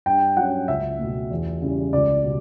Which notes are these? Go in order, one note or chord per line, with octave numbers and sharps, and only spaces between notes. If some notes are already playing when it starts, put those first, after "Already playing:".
G2 G5
F#3 C#4 F#5
C#2 E5
B2 A3
E2
C#3 E3 G3 C#4
C#2 D5
B2 G3